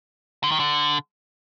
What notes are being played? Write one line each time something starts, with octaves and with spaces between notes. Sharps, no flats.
D3
D#3
D3